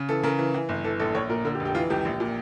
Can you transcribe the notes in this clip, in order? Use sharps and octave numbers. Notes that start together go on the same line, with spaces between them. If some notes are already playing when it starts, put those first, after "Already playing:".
Already playing: C#3
E3 A4
C#3 A#4
E3
E3
G1
E3 A4
A#1 A4
A#1 C#5
A#2 A#4
D3 A#4
G4
F1
G4
E3 F4
C#2 G4
A#1
A#2